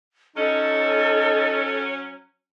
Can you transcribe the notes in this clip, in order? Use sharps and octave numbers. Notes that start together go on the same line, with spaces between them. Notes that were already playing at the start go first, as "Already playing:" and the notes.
F#3 C#4 D#4 A4